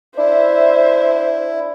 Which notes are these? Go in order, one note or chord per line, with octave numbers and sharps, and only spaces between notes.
D4 E4 C5 E5